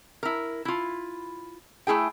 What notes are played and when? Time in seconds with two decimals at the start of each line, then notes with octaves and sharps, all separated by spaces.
0.23 E4 A#4
0.65 E4 F4
1.87 A3 E4 G#4 G5